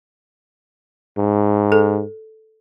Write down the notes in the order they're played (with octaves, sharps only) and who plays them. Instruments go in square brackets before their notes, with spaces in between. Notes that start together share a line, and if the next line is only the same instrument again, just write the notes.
[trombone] G#2
[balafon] A4